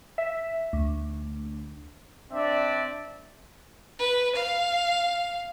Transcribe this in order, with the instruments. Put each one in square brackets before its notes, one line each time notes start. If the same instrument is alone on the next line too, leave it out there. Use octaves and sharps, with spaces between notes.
[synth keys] E5
D2
[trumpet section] C4 D4 D5 E5
[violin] B4
F5